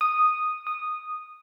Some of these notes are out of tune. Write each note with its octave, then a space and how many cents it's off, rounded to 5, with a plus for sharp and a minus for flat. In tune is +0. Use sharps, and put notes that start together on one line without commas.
D#6 -5
D#6 -10